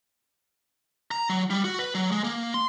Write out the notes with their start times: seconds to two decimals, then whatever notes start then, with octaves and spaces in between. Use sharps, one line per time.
1.11 A#5
1.29 F#3
1.50 G3
1.64 F#4
1.79 B4
1.95 F#3
2.11 G#3
2.24 A#3
2.54 C6